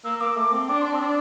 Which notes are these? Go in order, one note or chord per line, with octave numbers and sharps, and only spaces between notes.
A#3 E6
A#3 D6
A3 D6
C4
D4 D6
D4 C6
C4 E6
D4 D6